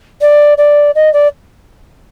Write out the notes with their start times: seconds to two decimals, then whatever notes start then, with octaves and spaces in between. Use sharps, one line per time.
0.21 D5
0.57 D5
0.95 D#5
1.13 D5